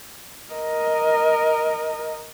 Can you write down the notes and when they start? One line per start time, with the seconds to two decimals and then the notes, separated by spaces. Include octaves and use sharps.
0.52 A#4 D#5